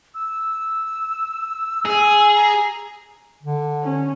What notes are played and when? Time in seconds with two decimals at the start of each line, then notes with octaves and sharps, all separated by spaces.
0.14 E6
1.85 G#4
2.35 A#5
3.43 D3
3.83 C#4